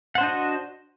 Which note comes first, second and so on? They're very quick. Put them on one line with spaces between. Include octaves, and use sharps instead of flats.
F#5 C5 D4 D#5 F#4